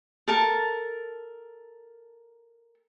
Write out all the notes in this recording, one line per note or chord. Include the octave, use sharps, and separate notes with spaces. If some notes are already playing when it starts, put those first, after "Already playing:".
A4 A#4 A5